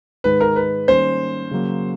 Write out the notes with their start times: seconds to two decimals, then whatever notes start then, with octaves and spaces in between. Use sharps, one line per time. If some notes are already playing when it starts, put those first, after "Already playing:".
0.24 G#2 D#3 G#3 B4
0.40 A#4
0.56 B4
0.88 D#3 G3 A#3 C#4 C5
1.51 C#3 F#3 A#3